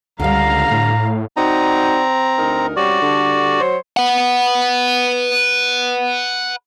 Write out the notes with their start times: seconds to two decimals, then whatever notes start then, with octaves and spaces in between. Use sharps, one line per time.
0.20 C#2 D3 G3 F5 A#5
0.71 A2
1.37 C4 D#4 F#4 D5 A#5
2.39 D2 D#4 A#4
2.76 G3 C4 C#4 F#4 D5
3.02 D3 G3 A4
3.60 F#3 C5 C#5
3.97 B4 F#5